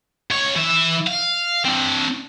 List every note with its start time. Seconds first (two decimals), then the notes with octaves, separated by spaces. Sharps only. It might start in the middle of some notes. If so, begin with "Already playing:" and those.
0.31 C#2 C#5
0.56 E3 E5
1.07 F5
1.65 C4 D4